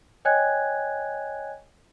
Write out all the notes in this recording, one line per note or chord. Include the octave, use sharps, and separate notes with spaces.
C#5 D#5 G5 G#5 F#6 G#6